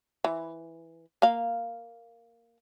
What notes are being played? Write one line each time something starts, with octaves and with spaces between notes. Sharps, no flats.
E3
A#3 F5